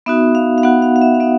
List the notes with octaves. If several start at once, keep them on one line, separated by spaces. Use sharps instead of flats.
B3 D#4 F#4 E5
F5
F5
B3 D#4 F#4 F#5
F5
F5
E5
F5
B3 D#4 E5